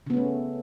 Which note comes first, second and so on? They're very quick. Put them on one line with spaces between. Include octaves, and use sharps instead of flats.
C#3 B3 C#4 A3